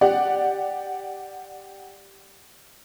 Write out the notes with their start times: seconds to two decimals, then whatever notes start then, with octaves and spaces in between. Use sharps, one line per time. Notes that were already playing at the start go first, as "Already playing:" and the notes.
0.01 G4 D5 F#5